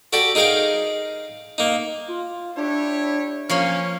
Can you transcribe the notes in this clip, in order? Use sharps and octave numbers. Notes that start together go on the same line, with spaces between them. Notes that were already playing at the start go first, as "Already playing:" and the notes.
F#4 G4 A4 D5
D#4 G#4 A#4 F5 G5
A#3 D#4
F4
D4 E4 G4 C#5
F3 A#3 C#4 C#5 F5